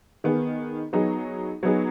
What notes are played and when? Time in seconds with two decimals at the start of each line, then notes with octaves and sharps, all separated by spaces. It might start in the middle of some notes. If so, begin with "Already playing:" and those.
0.24 D#3 B3 G#4
0.93 F#3 B3 D#4 G#4
1.63 F#3 B3 D#4 G#4